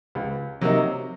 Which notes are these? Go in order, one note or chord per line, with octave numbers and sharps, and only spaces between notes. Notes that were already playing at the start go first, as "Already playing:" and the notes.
C#2
C3 F#3 A#3 D#4